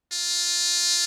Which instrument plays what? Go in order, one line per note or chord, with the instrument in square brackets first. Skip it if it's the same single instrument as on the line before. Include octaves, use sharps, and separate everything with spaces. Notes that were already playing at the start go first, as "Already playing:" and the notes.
[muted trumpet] F4